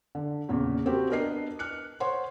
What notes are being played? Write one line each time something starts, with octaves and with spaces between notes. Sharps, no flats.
D3
E2 A#2 C#3
C4 F#4 G4 A#4
B3 D4 A#4 D#5 C7
F6 F#6 C#7
C5 C#5 F#5 C6